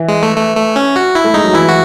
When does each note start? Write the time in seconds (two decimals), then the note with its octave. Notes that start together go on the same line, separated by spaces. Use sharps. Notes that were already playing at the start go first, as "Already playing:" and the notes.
Already playing: E3
0.08 G#3
0.23 A3
0.37 A3
0.57 A3
0.76 C#4
0.96 F#4
1.15 E4
1.24 A3
1.34 G#3 D#4
1.44 F#3
1.53 E3 E4
1.68 F#4